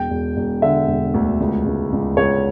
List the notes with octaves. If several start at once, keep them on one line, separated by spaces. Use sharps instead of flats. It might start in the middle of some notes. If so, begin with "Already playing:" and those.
Already playing: E1 G5
E1
E1
D3 E5
E1
D2
C#2
C#2
C#2
C#2 C#5